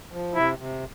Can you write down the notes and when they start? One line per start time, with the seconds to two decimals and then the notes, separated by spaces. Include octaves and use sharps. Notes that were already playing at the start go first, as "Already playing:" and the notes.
0.12 F3
0.35 C3 E4
0.58 C3